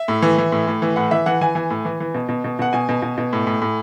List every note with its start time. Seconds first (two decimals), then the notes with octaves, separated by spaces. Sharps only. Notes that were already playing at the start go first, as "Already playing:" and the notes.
Already playing: E5
0.08 A2
0.22 E3
0.38 E3
0.52 A2
0.67 A2
0.82 E3
0.96 A2 F#5
1.11 E3 E5
1.26 E3 F#5
1.41 E3 G#5
1.55 E3 G#5
1.70 A2
1.85 E3
2.00 E3
2.14 B2
2.29 B2
2.44 B2
2.59 B2 F#5
2.73 B2 G#5
2.89 B2
3.02 B2
3.18 B2
3.33 A2
3.47 A2
3.62 A2